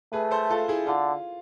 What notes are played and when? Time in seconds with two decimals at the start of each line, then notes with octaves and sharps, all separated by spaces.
0.13 A3 G#4 B4
0.31 A4 C5
0.50 F4 A4
0.68 E4 G#4
0.87 D3 F4